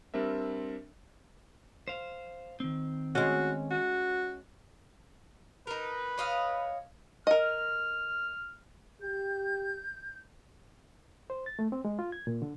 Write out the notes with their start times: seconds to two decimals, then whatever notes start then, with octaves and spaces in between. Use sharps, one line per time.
0.14 G3 C4 D4 A#4 E5
1.88 C5 F5
2.60 D#3 C4
3.15 G#3 C#4 F#4
3.71 F#4
5.67 D#4 A#4 B4
6.18 C#5 D#5 F5
7.27 A#4 D#5 F6
9.02 G4 G6
11.30 C5
11.46 A6
11.59 A3
11.72 C4
11.85 G#3
11.99 F4
12.12 G#6
12.27 A#2
12.42 D3